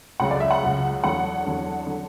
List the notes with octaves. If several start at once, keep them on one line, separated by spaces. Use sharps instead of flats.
C#2 C#3 F#3 F#5
D5
E5
F#5
C#2 C#3 F#3
E2 D3 F#3 F#5
E2 D3 F#3
D3 F#3